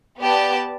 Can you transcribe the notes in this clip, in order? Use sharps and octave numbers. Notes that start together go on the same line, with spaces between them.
B3 G4 D5 A5